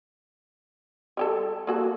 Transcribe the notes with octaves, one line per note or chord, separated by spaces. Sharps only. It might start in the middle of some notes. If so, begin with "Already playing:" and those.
G3 G4 A4
A#3 F#4 A4